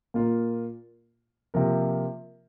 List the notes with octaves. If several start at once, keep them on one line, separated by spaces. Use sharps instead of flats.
A#2 A#3 F4
C3 F3 A#3 F4 A#4